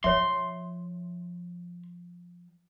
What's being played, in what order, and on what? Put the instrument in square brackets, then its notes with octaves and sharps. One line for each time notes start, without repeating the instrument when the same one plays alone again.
[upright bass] F3 [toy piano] C#5 E5 [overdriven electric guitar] C6